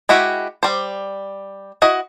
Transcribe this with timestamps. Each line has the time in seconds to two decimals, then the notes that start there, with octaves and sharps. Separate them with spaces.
0.09 G#3 E4 F#4 G4
0.63 G3 C5
1.82 E4 F#4 D#5